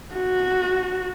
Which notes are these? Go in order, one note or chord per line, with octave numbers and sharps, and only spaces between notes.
F#4